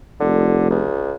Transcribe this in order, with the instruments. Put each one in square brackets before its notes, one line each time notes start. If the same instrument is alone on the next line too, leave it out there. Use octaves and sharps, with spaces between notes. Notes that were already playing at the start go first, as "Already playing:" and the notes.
[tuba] F1 [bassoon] D3
[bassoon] C#2